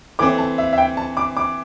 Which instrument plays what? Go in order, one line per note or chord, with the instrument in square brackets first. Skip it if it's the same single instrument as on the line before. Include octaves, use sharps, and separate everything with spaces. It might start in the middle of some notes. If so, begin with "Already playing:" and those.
[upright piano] E3 A3 C4 [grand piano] D6
[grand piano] A5
E5
E5
G5
A5
D6
D6